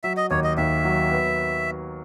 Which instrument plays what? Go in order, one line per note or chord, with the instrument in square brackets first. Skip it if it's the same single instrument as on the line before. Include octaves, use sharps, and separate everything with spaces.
[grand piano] F#3 [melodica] E5
[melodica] D#5
[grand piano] D#2 [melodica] C#5
[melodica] D#5
[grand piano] D#2 [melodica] E5
[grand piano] F#3
B3